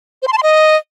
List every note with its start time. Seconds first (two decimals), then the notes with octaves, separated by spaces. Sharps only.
0.22 C5
0.27 C6
0.33 A5
0.38 C6
0.43 D#5